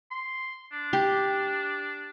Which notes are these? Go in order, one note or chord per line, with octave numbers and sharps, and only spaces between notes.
C6
D4
G4